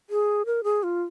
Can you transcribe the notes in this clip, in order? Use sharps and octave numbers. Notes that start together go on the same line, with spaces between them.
G#4
A#4
G#4
F4